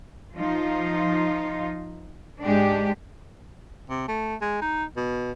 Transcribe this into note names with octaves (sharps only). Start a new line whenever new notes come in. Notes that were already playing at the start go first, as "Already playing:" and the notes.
F3 D#4 F4
G#2 G#3 D4 G4
C3
A3
G#3
D#4
B2